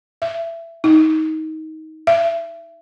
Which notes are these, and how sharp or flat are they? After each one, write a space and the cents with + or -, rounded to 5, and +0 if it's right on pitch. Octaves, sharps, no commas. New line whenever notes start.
E5 +20
D#4 +20
E5 +30